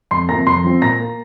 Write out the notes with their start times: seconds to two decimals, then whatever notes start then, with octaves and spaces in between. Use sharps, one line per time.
0.11 F2 C6 C7
0.28 C3 F3 A#3 A#5 A#6
0.47 F2 C6 C7
0.64 F3 C4
0.82 A#2 A#5 A#6
1.00 A#3